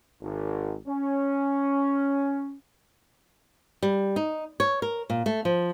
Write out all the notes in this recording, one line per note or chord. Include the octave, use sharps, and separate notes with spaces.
G#1
C#4
G3
D#4
C#5
A#4
A#2
A3
F3